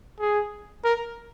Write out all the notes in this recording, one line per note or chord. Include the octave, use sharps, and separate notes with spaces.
G#4
A#4